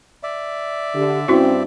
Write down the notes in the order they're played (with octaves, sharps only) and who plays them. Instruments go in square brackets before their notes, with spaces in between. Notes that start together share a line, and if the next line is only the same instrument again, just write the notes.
[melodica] D5 E5
[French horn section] D3 [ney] G4
[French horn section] G2 C4 [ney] C#4 [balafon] E4 F#4